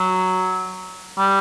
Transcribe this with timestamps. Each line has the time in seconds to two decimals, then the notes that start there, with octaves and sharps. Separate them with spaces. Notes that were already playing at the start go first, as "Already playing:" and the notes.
Already playing: F#3
1.18 G3